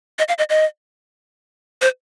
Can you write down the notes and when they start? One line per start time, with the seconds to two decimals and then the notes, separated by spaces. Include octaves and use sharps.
0.19 D#5
0.28 F5
0.38 D#5
0.50 D#5
1.82 C5